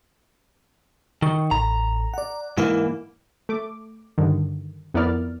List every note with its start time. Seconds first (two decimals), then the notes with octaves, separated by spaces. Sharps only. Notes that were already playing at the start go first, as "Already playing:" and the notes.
1.22 D#3 C#6
1.51 A1 A#5
2.14 D5 F#5
2.58 G#2 E3 A#3 E4
3.49 A3 D6
4.18 G2 D3 D#3
4.94 F2 B3 E4 A#4 D5 F6